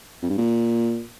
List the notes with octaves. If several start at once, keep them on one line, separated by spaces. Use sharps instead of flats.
F2
G2
A#2